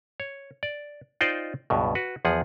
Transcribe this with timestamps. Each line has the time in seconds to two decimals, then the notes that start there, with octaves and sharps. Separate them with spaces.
0.20 C#5
0.63 D5
1.21 D#4 F4 C5 D5 D#5 G5
1.70 C#2 G2 B2
1.95 F#4 B4
2.25 E2 F3 G#4 F#5